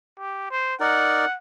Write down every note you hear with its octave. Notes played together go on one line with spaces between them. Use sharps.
G4
C5
D#4 A#4 D5 F#5